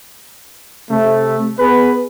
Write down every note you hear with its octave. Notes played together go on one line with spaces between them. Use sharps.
C3 A3
B3 G#4 B4